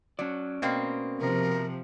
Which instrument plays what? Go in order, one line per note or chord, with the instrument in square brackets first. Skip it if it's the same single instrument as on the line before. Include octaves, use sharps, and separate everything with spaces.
[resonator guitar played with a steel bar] F#3 [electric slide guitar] C#4 D5
[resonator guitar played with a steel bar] B2 A#3 C4
[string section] C3 F3 [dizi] A#4